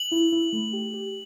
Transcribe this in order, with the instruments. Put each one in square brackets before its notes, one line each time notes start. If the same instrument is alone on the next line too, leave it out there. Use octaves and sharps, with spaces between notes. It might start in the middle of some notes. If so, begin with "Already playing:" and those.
Already playing: [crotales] F#7
[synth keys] E4
E4
A3
G4
G4